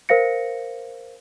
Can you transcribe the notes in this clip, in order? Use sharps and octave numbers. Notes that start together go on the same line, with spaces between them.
A#4 C5 F5 A#6 C#7